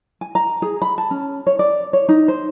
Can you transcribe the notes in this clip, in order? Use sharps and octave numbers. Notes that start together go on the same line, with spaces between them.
G#5
A#5
G#4
B5
A5
C#4
C#5
D5
C#5
D#4
C5